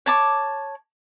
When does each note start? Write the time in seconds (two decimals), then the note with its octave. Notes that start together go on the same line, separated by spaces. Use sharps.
0.06 C#5 A5 D6